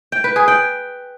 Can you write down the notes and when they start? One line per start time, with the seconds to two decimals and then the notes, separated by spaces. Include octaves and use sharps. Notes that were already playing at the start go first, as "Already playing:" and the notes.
0.12 G5
0.24 B4
0.36 G#4
0.48 G5